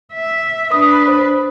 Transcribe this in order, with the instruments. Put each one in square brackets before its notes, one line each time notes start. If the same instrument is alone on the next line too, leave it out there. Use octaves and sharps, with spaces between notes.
[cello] E5
[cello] D4 B4 [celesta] D#6
[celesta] C5